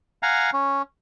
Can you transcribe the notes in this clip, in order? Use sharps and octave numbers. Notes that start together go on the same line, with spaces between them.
F5 F#5 G#5 A#5
C#4